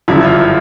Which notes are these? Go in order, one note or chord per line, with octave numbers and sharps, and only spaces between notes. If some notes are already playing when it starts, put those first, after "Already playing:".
G1 F#2 C#3 F3 E4
F4